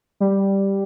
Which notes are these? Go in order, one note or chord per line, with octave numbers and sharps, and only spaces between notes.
G3